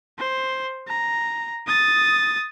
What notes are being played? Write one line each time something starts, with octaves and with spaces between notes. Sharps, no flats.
C5
A#5
D#6 A6